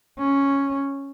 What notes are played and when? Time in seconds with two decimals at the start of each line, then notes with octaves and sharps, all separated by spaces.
0.18 C#4